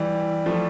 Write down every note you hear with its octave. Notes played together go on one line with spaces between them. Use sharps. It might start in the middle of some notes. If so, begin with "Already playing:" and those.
Already playing: E3 G3
F3 A3